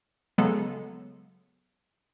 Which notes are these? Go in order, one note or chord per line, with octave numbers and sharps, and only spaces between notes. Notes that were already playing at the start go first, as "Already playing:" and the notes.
C#3 F#3 G#3 B3 A4